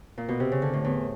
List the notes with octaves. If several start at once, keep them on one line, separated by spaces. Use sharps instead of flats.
A#2
B2
C3
C#3
D3
A2
E2